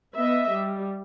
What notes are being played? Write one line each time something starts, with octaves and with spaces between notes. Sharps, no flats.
B3 D#5 E5
G3